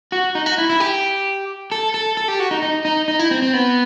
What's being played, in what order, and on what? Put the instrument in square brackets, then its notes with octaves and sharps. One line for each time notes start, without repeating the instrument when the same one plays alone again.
[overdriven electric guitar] F#4
D#4
F#4
E4
E4
G4
A4
A4
A4
G4
F#4
D#4
D#4
D#4
D#4
E4
C4
C4
B3